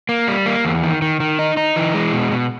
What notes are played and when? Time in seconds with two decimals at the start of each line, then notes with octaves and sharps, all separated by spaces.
0.09 A#3
0.28 G3
0.46 A#3
0.65 E2
0.83 D#3
1.02 D#3
1.20 D#3
1.39 D#4
1.57 D#4
1.76 E3
1.94 G#3
2.13 B2
2.32 B2